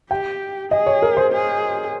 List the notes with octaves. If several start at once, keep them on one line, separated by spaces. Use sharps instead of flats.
G4 G5
G#4 D#5
C#5
A#4
C5
G#4